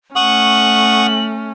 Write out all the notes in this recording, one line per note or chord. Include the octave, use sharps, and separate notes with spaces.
A3 C#4 F#5 C#6 D#6 F#7